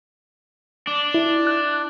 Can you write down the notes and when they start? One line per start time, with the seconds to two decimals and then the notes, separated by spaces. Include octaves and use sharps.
0.87 D4
1.14 E4
1.47 F#6